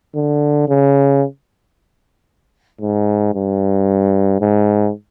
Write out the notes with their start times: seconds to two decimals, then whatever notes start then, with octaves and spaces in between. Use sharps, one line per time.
0.15 D3
0.68 C#3
2.81 G#2
3.35 G2
4.41 G#2